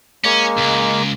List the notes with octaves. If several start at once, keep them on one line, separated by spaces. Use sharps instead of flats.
G#3 A#3 C#4
C#2